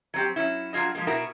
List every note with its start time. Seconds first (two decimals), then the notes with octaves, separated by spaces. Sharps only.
0.14 F#3 C4 G4
0.36 F#3 C#4 E4
0.73 F#3 D4 F4 G#4 D#5
0.95 F3 G#3 A#3
1.07 B2 E4 F#4 A#4 B4